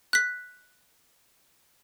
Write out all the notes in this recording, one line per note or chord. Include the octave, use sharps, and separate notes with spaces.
F#6 B6